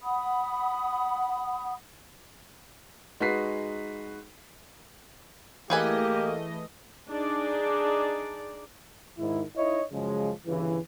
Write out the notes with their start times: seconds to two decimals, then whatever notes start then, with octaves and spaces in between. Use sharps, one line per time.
0.03 F#5 B5 D#6
3.20 G#3 D#4 F#4 B4 B6 C7
5.70 E3 A3 A#3 G4 G#4 B4 D#5 G#5
7.08 D4 D#4 G#4 D5
9.18 G#2 D#3 E4
9.56 D#4 E4 C#5 D#5
9.92 F#2 C#3 F3 F#3 G#3
10.46 G1 G2 C#3 E3